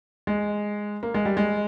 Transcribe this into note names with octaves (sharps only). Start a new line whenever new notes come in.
G#3
A#3
G#3
G3
G#3